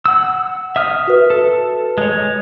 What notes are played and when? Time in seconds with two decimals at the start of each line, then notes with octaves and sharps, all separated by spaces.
0.06 F#5 E6
0.76 E5 D#6 F6
1.08 F#4 B4
1.30 A4
1.98 G#3 C#5